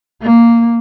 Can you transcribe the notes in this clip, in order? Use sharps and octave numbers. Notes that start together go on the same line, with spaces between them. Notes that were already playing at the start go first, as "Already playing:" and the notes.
A#3